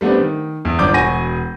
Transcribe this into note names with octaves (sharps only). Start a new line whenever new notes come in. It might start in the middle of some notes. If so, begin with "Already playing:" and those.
G3 A3 B3 C4 D4
D#3
E2
G1 D4 D6 G6
E1 F#4 G#5 C#6 A#6 D#7